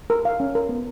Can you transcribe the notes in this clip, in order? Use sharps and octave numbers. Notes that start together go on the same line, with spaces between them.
A#4
F5
C#4
A#4
B3